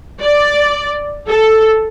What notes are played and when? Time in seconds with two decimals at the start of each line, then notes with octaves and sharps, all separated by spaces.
0.21 D5
1.29 A4